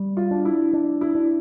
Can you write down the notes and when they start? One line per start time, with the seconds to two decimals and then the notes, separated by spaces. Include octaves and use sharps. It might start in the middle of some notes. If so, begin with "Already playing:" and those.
Already playing: G3
0.17 F4
0.31 D4
0.45 E4
0.73 D4
1.01 E4
1.15 D4